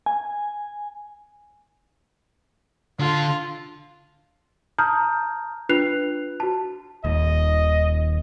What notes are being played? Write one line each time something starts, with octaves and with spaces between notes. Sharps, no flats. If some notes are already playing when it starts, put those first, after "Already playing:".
G#5
D3 F4 A4
A5 A#5 D#6 F6 G6
D4 F4 B4 F#6 C7 F7
F#4 A5
D#1 D#2 D#5